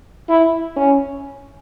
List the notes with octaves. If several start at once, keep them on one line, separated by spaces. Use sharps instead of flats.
E4
C#4